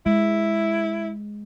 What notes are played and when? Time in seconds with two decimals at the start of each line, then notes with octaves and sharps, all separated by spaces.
0.06 G#3 E4